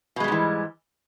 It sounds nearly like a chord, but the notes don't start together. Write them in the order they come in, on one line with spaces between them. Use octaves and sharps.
B2 G#3 G3 G#2 E3